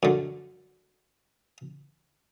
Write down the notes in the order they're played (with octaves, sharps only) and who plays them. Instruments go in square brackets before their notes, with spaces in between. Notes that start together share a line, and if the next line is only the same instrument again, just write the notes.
[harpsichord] F#2 D3